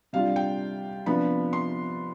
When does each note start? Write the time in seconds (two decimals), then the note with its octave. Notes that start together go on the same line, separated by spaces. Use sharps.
0.13 C3 G3 D4 F4 F5
0.36 G5
1.06 C3 F3 B3 D4 B5
1.53 C6